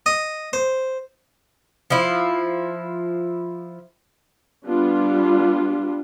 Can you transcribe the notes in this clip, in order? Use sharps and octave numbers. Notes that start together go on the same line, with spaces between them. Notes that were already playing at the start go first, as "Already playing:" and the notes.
D#5
C5
F3 E4
G3 B3 D4 F4